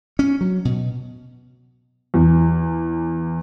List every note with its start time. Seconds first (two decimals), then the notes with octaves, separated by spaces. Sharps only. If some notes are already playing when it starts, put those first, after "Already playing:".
0.19 C#4
0.41 F#3
0.65 B2
2.14 E2